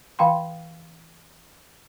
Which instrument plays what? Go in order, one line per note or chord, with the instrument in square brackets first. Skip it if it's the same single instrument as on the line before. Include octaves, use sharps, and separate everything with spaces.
[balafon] E3 F5 G5 C6